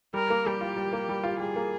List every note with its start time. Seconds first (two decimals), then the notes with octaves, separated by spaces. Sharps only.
0.14 G3 A#4
0.30 A#3
0.46 G3 G4
0.61 F4
0.77 G3
0.93 A#3
1.09 G3
1.24 F4
1.39 G3 G#4
1.56 A#3